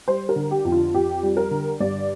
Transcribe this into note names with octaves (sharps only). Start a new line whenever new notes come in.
G3 C5
A#4
D3
G4
F2
F4
F2 G4
G3
A#4
D3
G2 D5